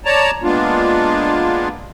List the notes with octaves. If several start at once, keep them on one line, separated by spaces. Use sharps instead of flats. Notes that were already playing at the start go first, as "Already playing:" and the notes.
C#5 D5 A5 A#5
G#3 A#3 B3 D4 F4